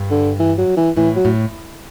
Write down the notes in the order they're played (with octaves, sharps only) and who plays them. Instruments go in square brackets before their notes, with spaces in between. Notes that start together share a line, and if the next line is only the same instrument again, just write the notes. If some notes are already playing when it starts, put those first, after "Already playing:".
Already playing: [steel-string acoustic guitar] G2
[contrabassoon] D3
E3
F#3
E3
[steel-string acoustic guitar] A2 [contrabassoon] E3
[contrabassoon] F#3
[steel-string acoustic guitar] A2